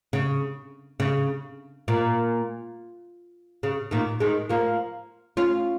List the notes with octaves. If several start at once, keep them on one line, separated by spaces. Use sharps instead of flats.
C#3
C#3
A#2
C#3
A#2 D#3
D#3 G#3
F3 A#3
C#4 F4